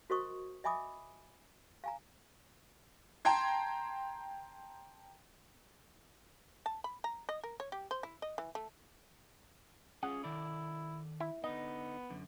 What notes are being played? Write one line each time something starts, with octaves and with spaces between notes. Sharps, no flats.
F#4 A#4 C5 D#5 C#6 D#6
D#5 E5 G#5 B5 D6 D#6
F5 G#5 A#5
G5 A5 A#5 C6 G#6
A5
B5
A#5
D#5
A#4
C#5
G4
C5
E4
D#5
E3
A3
C#4 F4 G#4 F#5
D#3 E4 A4 D5
E4
D3 B3 D#4 D#5
F#2 D3